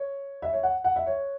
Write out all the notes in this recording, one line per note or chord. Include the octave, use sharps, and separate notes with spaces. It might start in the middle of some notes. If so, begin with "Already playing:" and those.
Already playing: C#5
E5
C#5
F#5
F#5
E5
C#5